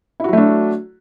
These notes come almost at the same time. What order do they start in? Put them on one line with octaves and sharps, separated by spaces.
E4 F#4 F#3 A3 D4